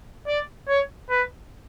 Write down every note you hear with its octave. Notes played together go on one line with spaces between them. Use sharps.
D5
C#5
B4